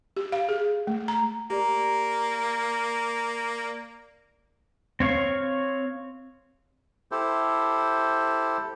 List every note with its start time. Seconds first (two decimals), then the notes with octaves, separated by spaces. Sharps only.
0.17 G4
0.32 F5
0.49 G#4
0.87 A3
1.08 A#5
1.50 A#3 G4 D5 A#5
5.00 C4 C#5 F5 C#6
7.12 E4 G4 A4 C5